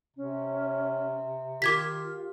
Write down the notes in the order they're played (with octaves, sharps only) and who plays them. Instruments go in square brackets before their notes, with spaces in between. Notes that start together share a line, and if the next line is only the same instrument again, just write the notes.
[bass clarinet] C3 [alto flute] C#4
[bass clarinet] D#3 [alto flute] F4 [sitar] G4 [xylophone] D6 G#6 B6